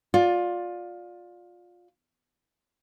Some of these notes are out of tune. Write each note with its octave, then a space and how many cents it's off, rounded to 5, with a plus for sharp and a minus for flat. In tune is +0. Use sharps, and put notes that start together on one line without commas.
F4 +20 D5 -5